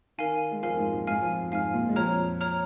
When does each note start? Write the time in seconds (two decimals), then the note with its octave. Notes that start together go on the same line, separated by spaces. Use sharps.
0.18 D#3 A#4 F5 G#5
0.51 G#3
0.63 F2 F3 A#4 F5 G#5
0.77 G#2 G#3
0.92 A#2 A#3
1.07 G#2 G#3 F5 G#5 F6
1.21 F2 F3
1.51 G#2 G#3 F5 G#5 F6
1.74 A#2 A#3
1.89 G#3
1.96 F2 F3 C#5 A#5 F6
2.41 C#5 A#5 F6